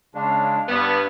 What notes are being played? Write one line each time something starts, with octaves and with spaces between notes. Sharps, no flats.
C#3 G#3 C#4 D4 D5 F5
G2 B3 B4 D5 F5